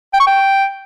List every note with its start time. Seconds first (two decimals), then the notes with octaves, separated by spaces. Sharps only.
0.13 G5
0.20 C#6
0.27 G5